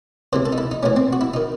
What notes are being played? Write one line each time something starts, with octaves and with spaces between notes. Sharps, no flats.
C#2 C3 E3 C5
A4
D#4
E4
D#4
A1 A2 E3 C#4
C4
F#4
E4
D#3 D#4